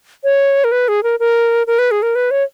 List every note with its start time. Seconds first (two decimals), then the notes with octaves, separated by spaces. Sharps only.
0.24 C#5
0.64 A#4
0.72 B4
0.88 G#4
1.03 A#4
1.20 A#4
1.67 A#4
1.79 B4
1.91 G#4
2.02 A#4
2.15 B4
2.31 C#5